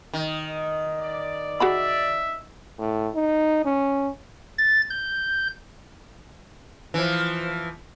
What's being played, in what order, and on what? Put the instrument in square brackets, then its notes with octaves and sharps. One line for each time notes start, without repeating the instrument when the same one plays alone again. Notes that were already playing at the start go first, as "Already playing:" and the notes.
[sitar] D#3
[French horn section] D5
[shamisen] F#4 G#4 B5 [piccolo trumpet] E5
[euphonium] A2
D#4
C#4
[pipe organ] A6
G6
[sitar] E3 F3